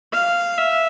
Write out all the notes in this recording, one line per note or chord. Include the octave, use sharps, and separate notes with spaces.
F5
E5